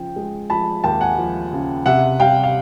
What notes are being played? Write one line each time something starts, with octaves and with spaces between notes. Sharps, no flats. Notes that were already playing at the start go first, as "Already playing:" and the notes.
Already playing: C#3 F3 G5
G#3
F3 A5 B5
D#2 G5 A5
F#5 G#5
F3
C#3
C3 E5 F#5
G3 F5 G5
F5